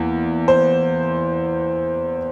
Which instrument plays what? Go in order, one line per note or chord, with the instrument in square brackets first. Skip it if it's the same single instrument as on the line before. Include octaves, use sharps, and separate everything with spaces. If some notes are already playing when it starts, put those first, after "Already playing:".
Already playing: [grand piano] E2 A#3
C5